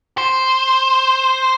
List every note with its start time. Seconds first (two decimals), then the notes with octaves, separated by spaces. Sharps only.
0.18 C5